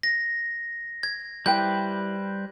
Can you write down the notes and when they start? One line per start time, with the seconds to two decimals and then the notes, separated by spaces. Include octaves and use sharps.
0.03 A#6
1.03 G#6
1.46 G3 E4 B4 C5 G5 G6